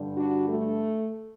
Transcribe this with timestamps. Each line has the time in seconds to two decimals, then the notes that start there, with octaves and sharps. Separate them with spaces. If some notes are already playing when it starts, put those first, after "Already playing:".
Already playing: G2 D3 G3
0.15 D4 F#4
0.47 A3